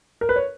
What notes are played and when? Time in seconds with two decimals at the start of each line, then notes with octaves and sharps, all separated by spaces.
0.21 A#4
0.29 B4
0.36 C#5